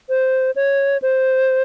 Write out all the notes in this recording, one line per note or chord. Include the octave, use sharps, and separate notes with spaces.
C5
C#5
C5